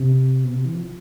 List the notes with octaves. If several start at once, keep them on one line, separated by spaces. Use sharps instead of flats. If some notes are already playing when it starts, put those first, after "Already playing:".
Already playing: C3
B2
C3
E3
F3